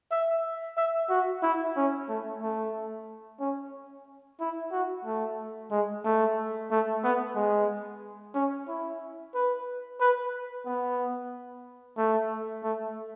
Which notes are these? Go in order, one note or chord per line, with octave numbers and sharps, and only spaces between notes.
E5
E5
F#4
E4
C#4
A3
A3
C#4
E4
F#4
A3
G#3
A3
A3
B3
G#3
C#4
E4
B4
B4
B3
A3
A3